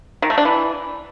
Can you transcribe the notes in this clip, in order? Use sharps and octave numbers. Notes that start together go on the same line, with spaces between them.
D#3
A3
D4
E3